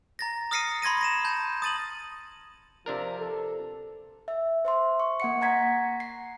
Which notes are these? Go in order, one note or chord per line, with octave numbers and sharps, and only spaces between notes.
A#5 A6 A#6
D#6 F6 A#6 C7 C#7 D#7
B5 C6 G#6 A#6 D#7
A#6 D#7 E7
A5 G6
D#6 A6 D#7 F#7
C3 F3 D4 A#4
A4
E5
C5 E5 C6
C#6
A#3 F#5 C#7
F#5 A#5 G#6 B6
C7